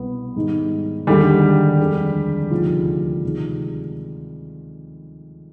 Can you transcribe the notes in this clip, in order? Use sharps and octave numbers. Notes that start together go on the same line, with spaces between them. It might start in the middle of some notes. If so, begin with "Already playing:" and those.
Already playing: C2 B2 G3 B3 B4
G#2 D#3 G3
D#2 D3 G3 G#3 G4
F2 D3 G#3
D2 C3 D#3 F3 G#3 F4
C3 D#3 G#3